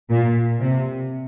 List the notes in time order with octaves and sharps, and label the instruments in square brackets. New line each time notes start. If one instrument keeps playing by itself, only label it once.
[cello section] A#2
C3